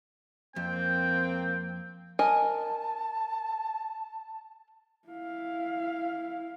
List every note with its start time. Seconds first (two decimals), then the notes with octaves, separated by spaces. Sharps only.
0.56 F2 A#3 C4 G5
2.19 A#4 D#5 G#5 A5
5.08 E4 F5